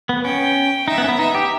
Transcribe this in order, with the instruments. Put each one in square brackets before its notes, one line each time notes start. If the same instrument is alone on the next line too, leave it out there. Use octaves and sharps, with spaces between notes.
[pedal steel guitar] B3
[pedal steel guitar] C#4 [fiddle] G5
[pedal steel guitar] D#4 [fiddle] E5
[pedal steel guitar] B3
C#4
B3
[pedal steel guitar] D#4 [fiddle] E5
[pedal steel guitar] G4